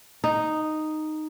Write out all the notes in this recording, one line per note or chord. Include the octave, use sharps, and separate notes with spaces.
D#4